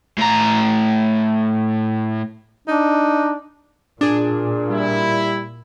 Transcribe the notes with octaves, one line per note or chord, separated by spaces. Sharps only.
A2 A#5
D4 D#4
A#2 D4 G#4
G3 E4